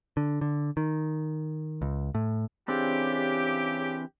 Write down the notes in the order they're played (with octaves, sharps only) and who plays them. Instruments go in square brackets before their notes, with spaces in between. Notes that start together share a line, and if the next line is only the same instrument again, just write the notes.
[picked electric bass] D3
D3
D#3
C#2
A2
[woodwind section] C#3 G4 [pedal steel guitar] E3 C4 D4